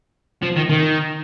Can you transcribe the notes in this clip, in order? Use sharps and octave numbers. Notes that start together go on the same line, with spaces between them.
F3
D#3
D#3